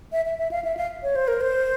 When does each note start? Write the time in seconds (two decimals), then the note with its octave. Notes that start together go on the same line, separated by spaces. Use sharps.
0.12 E5
0.25 E5
0.39 E5
0.51 F5
0.65 E5
0.77 F5
1.03 C#5
1.16 C5
1.28 A#4
1.41 C5